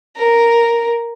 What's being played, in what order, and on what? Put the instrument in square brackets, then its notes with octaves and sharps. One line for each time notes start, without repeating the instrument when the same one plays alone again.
[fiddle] A#4